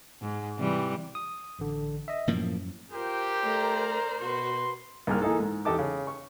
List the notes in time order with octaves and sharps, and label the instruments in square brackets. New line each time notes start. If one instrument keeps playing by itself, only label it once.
[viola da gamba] G#2
C3 E3 G3
[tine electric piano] D#6
A1 D3
D#5 E5
[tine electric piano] F#2 [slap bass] A2 F3 A#3
[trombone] F4 [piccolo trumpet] G4 [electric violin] A#4 C5
[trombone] A3 [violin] D5 A#5
[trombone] B2 [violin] F#4 B4 [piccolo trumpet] C6
[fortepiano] C2 G#2 G#3 A#3 F6
E3 A#3 D#4 G#4 A4
G#2
E2 G4 A4 D#5 A5 D6
C#3
C#6